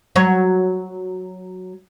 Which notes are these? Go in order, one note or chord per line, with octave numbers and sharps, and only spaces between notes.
F#3 C#5